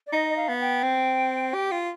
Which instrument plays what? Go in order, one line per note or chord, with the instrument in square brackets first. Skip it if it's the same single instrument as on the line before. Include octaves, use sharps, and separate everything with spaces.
[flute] D5
[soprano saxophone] D#4 [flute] D#5
[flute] D#5
F5
[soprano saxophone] B3
[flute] G5
[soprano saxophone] C4
G4
F4